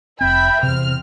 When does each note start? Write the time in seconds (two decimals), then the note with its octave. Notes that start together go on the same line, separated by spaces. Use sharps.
0.21 F1 C4 E5 G5 B5
0.63 E2 C3 C4 F6